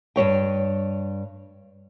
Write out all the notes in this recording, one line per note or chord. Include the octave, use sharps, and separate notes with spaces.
G2 C#3 C#5 G5